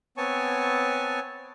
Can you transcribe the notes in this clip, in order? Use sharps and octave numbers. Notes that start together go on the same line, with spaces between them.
B3 C4 C#5 G#5 A5 C#6